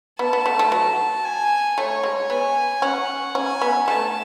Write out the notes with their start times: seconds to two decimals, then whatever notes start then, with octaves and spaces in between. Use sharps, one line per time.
0.19 B3 A5
0.33 B3
0.46 A3
0.59 A3
0.72 F#3
1.25 G#5
1.77 A3 C#5
2.03 G#3
2.30 B3 G#5
2.82 C#4 F#5
3.35 C#4 G#5
3.61 B3
3.87 A3 A5